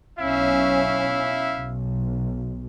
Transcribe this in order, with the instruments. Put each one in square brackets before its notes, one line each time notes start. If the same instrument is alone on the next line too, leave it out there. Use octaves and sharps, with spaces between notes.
[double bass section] B1 C#4 [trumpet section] E4 E5 F5
[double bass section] B1